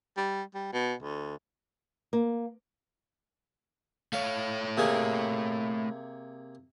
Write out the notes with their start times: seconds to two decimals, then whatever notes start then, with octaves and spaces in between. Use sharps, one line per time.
0.17 G3
0.54 G3
0.73 B2
1.03 D2
2.13 A#3
4.13 A3 C#5 F5
4.77 C3 A#3 G#4